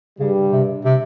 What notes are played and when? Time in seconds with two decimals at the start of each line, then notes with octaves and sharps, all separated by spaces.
0.19 G2 C#3 G3
0.52 C3
0.85 C3